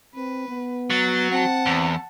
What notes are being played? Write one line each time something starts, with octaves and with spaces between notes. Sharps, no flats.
C4 B4
B3
F#3 A6
C4 F#5 A5
E2